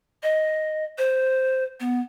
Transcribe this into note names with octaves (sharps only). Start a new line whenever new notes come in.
D#5
C5
B3